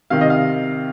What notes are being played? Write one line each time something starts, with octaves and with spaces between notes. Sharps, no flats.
C3 D#3 F5
D#5
F5